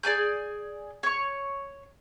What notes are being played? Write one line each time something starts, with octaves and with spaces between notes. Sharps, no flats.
G#4 D5 G#5 G6
C#5 C#6